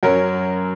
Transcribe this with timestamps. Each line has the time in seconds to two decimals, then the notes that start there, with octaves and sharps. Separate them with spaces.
0.03 F#2 F#3 C#4 A#4